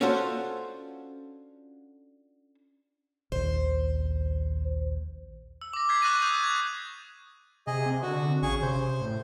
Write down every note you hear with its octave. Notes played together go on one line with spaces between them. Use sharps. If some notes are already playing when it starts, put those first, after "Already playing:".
C#4 D4 F4 F#4 A4 C5
A#1 D#2 C5
E6
D6 A#6
F6 G6 G#6 B6 C7
C#6 E6 F#6 A6 A#6 D#7
D#6 E6 G6
G#6
C3 G#4 D#5
C4
D3 F#4
A1 C#3 G#4 C#6
C3 C5
A2